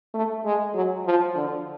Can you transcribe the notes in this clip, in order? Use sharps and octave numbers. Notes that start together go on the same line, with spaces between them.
A3
G#3
F#3
F3
D3